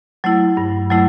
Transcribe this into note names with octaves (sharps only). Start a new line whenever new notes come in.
F#3 A3 E4
G2
F#3 A3 E4